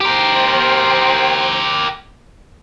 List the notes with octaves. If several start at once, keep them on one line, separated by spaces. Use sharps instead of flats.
G4 A#4 C5 G5